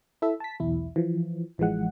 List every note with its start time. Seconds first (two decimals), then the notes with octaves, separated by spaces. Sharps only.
0.22 E4 A4 E5
0.40 A5 B6
0.60 B1 E2 E4
0.96 E3 F3
1.58 A1 E3 F3 G#3 F#5